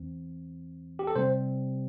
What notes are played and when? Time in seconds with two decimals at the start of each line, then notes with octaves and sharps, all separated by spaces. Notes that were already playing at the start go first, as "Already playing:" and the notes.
Already playing: E2 E3 C4
0.99 G4
1.07 A4
1.16 C3 G3 C4 C5